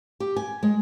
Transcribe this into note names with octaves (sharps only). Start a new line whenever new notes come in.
G4
G#5
G#3